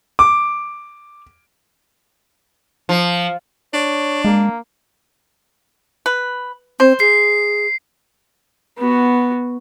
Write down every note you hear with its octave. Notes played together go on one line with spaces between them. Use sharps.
D6
F3
D4 C#5
G#3 A#3
B4
C4 C5
G#4 C7
B3 F#4